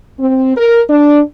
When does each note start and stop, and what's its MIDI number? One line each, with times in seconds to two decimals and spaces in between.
0.19 0.54 60
0.57 0.81 70
0.90 1.20 62